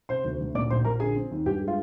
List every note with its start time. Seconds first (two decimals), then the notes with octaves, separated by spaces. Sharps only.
0.09 C3 C5 C6
0.25 D2
0.40 D2
0.55 A#2 D5 D6
0.70 A#1 C5 C6
0.85 A#1 A#4 A#5
1.00 D3 G#4 G#5
1.16 C4
1.31 D#2
1.46 G2 G4 G5
1.61 G#3
1.68 F4